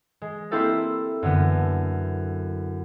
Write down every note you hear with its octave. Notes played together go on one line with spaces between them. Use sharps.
G#3
A#3 C4 E4 G4 A4 E5
F#2 D3 B3